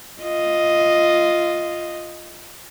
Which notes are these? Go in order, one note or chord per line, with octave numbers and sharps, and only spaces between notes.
F4 D#5